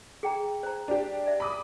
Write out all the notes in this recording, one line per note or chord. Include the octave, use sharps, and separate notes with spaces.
G#4 G5 A#5
C5 A#5
D4 G4
D5 E5
B5 D6 D#6